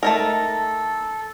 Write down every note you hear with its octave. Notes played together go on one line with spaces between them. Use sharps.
A3 D#4 A4 A#4